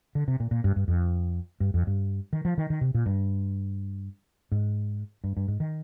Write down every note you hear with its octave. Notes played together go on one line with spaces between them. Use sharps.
D3
C3
A#2
A#2
G2
G2
F2
G2
F2
G2
D#3
F3
D#3
D#3
C3
A#2
G2
G#2
G2
G2
G#2
D#3